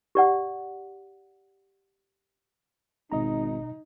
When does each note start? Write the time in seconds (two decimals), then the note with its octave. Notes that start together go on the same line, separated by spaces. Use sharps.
0.15 G4 D5 F#5
3.12 G#1 B2 D#4 D#5 A#5